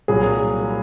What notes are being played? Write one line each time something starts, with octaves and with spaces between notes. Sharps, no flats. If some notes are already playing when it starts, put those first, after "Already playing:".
C2 A#2 F#3 G#4